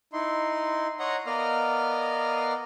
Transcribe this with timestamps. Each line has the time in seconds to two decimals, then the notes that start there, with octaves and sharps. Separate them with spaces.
0.13 D#4 E4 C6
1.00 C#5 D#5 F#5 A#5 C6
1.27 B3 A#4 D5 D#5 F5 F6